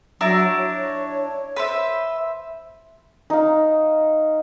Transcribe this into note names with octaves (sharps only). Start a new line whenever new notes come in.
F#3 D4 E4 A#5
C#5
B4 C5 E5
D#4 F5